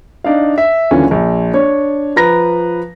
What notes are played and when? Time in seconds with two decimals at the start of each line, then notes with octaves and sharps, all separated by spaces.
0.24 D4 D#4 F5
0.58 E5
0.91 D#1 D3 E3 C#4 F4
1.11 A#1
1.54 D4 C#5
2.16 F3 B4 A#5 A#6